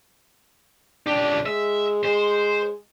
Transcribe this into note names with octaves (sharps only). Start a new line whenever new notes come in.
C#2 D4 G4
G#3 E5
G#3 C5